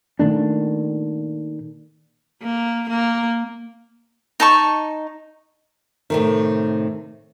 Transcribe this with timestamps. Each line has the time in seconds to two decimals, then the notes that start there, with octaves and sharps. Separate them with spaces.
0.19 A#2 D#3 A3 D4
2.43 A#3
2.90 A#3
4.40 D#4 A5 C#6
6.10 A2 C3 D#3